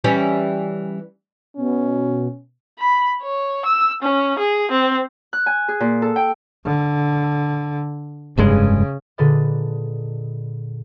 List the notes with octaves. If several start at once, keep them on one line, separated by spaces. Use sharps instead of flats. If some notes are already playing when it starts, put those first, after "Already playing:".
E3 G3 C#4
B2 C#4
B5
C#5
E6
C#4
G#4
C4
F#6
G#5
G#4
A#2
A4
G5
D3
F1 G2 C#3 G#3
A#2 D3 G#4 B4 D#5 A6